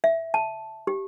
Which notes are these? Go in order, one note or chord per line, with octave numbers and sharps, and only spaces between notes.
E5
A5
G4